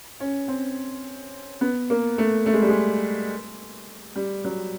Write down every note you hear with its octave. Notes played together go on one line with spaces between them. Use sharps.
C#4
C4
B3
A#3
A3
A3
G#3
G3
G#3
G3
F#3